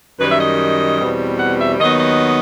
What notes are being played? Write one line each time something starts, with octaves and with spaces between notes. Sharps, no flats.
F#2 D#3 G3 B4
E5
D#5
E2 B2 G3 C4
F#5
E5
D#2 D#3 F#3 B3 D#5
D#5